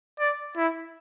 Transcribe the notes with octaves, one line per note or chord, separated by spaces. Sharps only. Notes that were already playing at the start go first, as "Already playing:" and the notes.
D5
E4